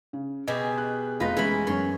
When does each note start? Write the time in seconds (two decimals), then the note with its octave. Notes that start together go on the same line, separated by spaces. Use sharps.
0.13 C#3
0.48 B2 G4 G#4 D#5
0.78 F#6
1.20 F1 D#4 F4 B4 A#6
1.37 E3 G#3 C#4 B5
1.67 F#2 C#4 C#5 C6